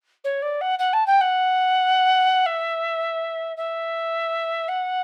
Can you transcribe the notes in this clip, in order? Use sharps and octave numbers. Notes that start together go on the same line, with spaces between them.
C#5
D5
F#5
F#5
A5
G5
F#5
E5
E5
F#5